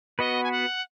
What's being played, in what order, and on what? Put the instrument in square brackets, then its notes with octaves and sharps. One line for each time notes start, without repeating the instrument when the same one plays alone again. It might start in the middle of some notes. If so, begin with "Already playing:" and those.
[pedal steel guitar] B3 F#4 B4 [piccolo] D#5
[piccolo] G#5
F#5